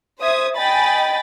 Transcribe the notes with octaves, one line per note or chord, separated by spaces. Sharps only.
C5 E5 D#6 G#6
D#5 G5 G#5 B5 A6